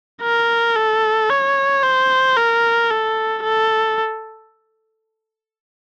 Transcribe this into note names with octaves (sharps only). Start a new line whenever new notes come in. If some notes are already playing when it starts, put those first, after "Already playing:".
A#4
A4
C#5
C5
A#4
A4
A4